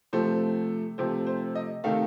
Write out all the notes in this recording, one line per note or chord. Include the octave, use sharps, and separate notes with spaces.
C3 F3 A3 C5
C3 F3 A3 C5
C5
D#5
C3 D#3 A3 F5